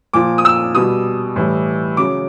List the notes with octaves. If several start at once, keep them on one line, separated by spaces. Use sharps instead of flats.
A#2 F3 D6
D#6
E6
B2 G3 D#6
A2 E3 G3
C#3 F#3 D6